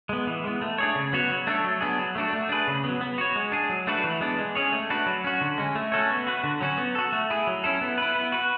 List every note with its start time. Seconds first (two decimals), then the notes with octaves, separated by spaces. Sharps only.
0.09 G#3 B3
0.27 E3
0.44 G#3 B3
0.62 A3
0.78 D4 G#4 C#5
0.95 C#3
1.13 F#3 B3 F#4 C#5
1.30 F#3
1.47 A3 D4 A4 C#5
1.64 F#3
1.81 B3 D4 G#4
1.99 F#3
2.15 A3 D4 F#4
2.33 A3
2.49 D4 G#4 B4
2.67 C#3
2.84 F#3 B3
3.01 B3
3.18 F#4 C#5
3.36 G#3
3.52 D4 G#4
3.70 F#3
3.87 A3 D4 F#4 B4
4.04 E3
4.21 G#3 B3 D4
4.39 G#3
4.55 C#4 G#4 C#5
4.72 A3
4.90 D4 F#4 B4
5.06 F#3
5.24 C#4 F#4
5.41 D3
5.58 G#3 C#4
5.75 A3
5.92 C#4 F#4 A4 C#5
6.10 B3
6.27 F#4 B4
6.44 D3
6.61 F#3 C#4 F#4
6.78 B3
6.95 F#4 A4
7.13 A3
7.30 E4 G#4
7.47 F#3
7.64 C#4 E4 A4
7.81 B3
7.98 E4 B4
8.15 B3
8.32 F#4 B4